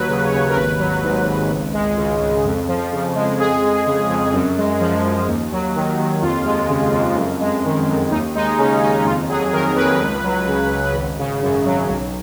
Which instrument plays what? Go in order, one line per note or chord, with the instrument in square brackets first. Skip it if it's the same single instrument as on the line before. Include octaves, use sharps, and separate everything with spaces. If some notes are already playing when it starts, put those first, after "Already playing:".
Already playing: [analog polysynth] D#2 F#3 B4
C#3
C#5
D#2
A#4
G#1 B4
F#3
G#2
G#1
C#2
G#3
C#3
C#2
F2
F3
C#3
G#3
F2 G#4
G#3
C#3
F2
F#2
G#3
F3
F#2
D#2
F#3
D#3
D#2
F2 F4
G#3
C#3
F2
F#2
G#3
D#3
F#2
D#2 D#4
G#3 D#4
C#3 C#4
D#2 D#4
F2 F4
F#3 G#4
D#3 A#4
A#4
F2 B4
C#2
F#3
C#3
C#2
G#1
C#3
F#2
F#3
B1